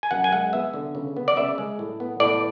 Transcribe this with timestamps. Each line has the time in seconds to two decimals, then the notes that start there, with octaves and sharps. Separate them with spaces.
0.03 G#5
0.11 F#2 F#5
0.24 G#5
0.33 G#3 F#5
0.53 B3 E5
0.74 D3
0.95 C#3
1.16 B3
1.28 D5
1.36 C#3 E5
1.58 G#3
1.79 A2
2.00 B3
2.20 A2 D5